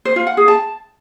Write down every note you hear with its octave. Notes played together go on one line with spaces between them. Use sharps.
C5
F4
F#5
G#4
A5